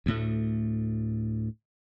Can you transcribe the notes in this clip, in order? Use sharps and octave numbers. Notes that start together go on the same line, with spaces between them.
D2 A2 A3